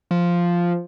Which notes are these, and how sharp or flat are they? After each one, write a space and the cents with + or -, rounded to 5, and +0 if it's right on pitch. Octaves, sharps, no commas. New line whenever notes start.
F3 -5